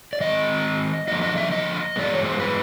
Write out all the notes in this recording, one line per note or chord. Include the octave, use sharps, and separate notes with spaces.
D5
D#3 G#3 C4 D#5
D3 F3 A#3 D4 D#5
D#5
E5
D#5
G2 E3 G#3 B3 D5
C#5
C5
B4